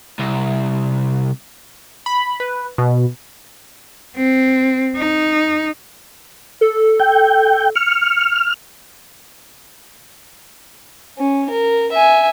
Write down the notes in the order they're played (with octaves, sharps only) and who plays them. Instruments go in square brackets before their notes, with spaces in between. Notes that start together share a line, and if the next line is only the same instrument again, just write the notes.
[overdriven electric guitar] C2
[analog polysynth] B5
B4
B2
[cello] C4
D#4
[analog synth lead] A4
[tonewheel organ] G5
[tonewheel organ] F6 [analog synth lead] C#7
[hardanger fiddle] C#4
A#4
E5 G#5